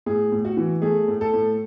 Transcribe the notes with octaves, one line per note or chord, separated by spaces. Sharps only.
A2 G#4
A2
F#4
E3
A3 G#4
A2
A4
A2